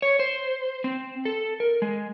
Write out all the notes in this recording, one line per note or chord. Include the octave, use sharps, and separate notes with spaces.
C#5
C5
C4
A4
A#4
G#3